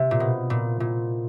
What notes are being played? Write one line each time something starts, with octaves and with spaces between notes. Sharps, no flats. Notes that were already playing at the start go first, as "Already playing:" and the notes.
Already playing: C3
A#2
B2
A#2
A#2